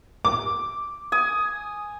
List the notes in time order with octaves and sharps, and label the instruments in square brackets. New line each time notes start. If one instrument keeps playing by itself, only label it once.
[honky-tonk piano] D6
[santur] G#5 D#6